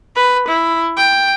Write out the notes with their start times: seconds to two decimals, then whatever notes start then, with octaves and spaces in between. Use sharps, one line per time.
0.16 B4
0.48 E4
0.97 G5